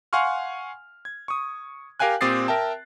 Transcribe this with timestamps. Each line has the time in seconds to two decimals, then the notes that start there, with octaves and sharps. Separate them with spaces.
0.13 F5 F#5 G#5 C6 C#6 F6
1.05 G#6
1.28 C#6 D#6
2.00 G4 A#4 F5 G5 G#5 F#6
2.21 A#2 C4 G4 D#6 A6 C7
2.48 A#4 E5 G5 A5